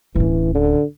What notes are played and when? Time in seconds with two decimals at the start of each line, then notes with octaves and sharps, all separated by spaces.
0.15 D1 E3 C#4
0.54 D3